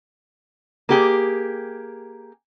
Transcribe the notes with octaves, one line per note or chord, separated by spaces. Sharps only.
A#3 G4 G#4